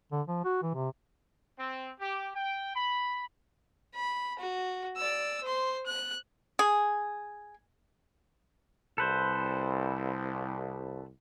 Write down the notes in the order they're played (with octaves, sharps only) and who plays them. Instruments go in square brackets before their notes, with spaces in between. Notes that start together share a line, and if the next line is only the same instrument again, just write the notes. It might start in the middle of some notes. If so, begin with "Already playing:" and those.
[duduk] D3
F3
F#4
E3
C3
[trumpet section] C4
G4
G5
B5
[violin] B5
F#4
D5 E6
C5 C6
F#6
[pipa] G#4
[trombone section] C2 [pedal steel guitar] A4 B4 C5